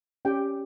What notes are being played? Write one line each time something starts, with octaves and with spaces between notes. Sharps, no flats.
C#4 G4 G5